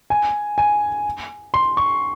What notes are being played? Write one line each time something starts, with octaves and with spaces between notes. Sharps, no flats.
G#5
G#5
C6
C#6